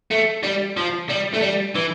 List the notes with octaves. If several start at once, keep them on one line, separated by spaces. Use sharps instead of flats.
A3
G3
F3
G3
A3
G3
E3